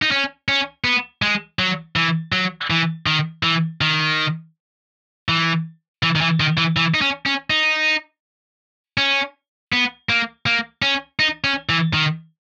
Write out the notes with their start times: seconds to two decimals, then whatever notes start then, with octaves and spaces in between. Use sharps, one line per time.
0.02 D#4
0.11 C#4
0.49 C#4
0.84 B3
1.22 G#3
1.59 F#3
1.96 E3
2.32 F#3
2.70 E3
3.06 D#3
3.43 E3
3.81 D#3
5.29 E3
6.03 E3
6.16 D#3
6.21 E3
6.40 D#3
6.57 E3
6.77 E3
6.94 D#4
7.01 C#4
7.26 C#4
7.50 D#4
8.98 C#4
9.73 B3
10.09 A#3
10.46 A#3
10.82 C#4
11.20 D#4
11.44 C#4
11.69 E3
11.93 D#3